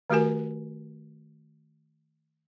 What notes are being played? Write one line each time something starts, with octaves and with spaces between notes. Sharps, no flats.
D#3 A3 F#4 G4 A#4 G#5